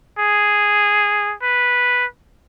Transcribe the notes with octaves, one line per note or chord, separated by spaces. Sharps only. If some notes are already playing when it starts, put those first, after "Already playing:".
G#4
B4